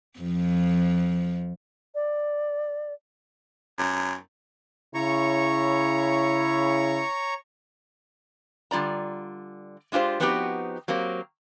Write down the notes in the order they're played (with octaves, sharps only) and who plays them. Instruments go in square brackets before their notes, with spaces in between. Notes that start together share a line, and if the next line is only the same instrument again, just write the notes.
[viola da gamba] F2 F3
[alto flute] D5
[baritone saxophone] F#2
[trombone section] C#3 E4 [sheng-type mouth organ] C#5 A#5 C#6
[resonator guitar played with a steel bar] D3 G3 F4 D5 A#5
G#3 D4 F4 G4 C5
F3 B3 C4 D#4 F#4 G4
F#3 A#3 C4 G4